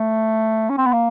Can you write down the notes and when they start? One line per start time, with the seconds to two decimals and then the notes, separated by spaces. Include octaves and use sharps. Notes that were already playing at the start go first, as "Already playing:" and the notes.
Already playing: A3
0.69 C#4
0.78 C4
0.85 B3
0.93 A#3